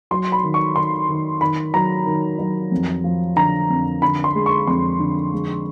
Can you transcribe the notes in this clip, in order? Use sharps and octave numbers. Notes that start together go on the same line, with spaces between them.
F#3 C6
B5
D#3
C#6
D#3 C6
D#3
D#3 B5
F#3 A#5
D#3
F#3
F2
F3
D3 A#5
F2
D3 B5
C6
G#3
C#6
F2 C6
D3
G#3